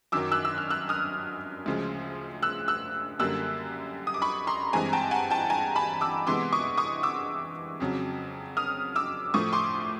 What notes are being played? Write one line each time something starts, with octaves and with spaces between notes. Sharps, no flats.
F#2 D#3 F#3 D6 E6
E6 F#6
E6
F6
E6 F#6
D#6 F6
D2 C#3 F3 G#3
E6 F#6
E6 F#6
F#2 D3 G3 A#3 E6 F#6
D#6
D6
B5 C#6
A#5 C6
G2 E3 G#3 C4 G#5 A#5
G5 A5
F#5 G#5
G5 A5
G#5 A#5
A5 B5
D6 E6
C3 E3 G#3 B3 C6 D6
C#6 D#6
C#6 D#6
D6 E6
F2 C#3 F#3
D#6 F6
D6 E6
A2 F3 A3 C#6 D#6
C6 D6